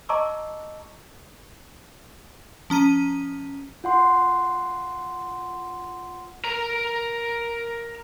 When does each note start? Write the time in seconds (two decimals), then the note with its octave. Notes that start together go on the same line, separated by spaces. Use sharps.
0.09 D#5 A5 A#5 C#6 D6 E6
2.70 F3 C#4 A#5 D#7
3.84 F4 F#5 C6
6.44 A#4 A#5